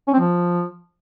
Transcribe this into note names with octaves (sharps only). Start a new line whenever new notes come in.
C#4
C4
F3